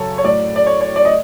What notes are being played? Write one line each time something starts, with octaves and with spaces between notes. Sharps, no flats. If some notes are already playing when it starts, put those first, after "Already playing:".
Already playing: F#2 C#3 F#3 A4 C#5
C#5
A2 F#3 D5
D5
C#5
C#5
D5
D#5